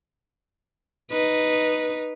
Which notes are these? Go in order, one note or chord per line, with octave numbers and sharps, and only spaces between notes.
D#4 B4